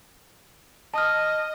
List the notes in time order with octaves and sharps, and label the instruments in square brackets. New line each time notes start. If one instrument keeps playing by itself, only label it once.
[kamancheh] D#5 [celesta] A5 D#6 F6